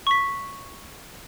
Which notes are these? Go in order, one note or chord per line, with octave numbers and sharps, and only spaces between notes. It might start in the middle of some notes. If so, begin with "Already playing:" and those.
C#6 B6